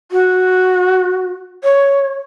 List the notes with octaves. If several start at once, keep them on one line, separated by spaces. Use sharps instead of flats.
F#4
C#5